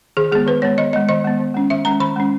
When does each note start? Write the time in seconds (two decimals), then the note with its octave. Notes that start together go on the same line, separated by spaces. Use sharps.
0.17 D#3 G#4
0.32 G#3 B3 G#4
0.47 D#3 B4
0.62 G#3 B3 C#5
0.78 D#3 D#5
0.93 G#3 B3 D#5
1.09 D#3 D#5
1.24 G#3 B3
1.40 D#3
1.55 G#3 C#4
1.70 D#3 E5
1.85 G#3 C#4 A#5
2.00 D#3 B5
2.16 G#3 C#4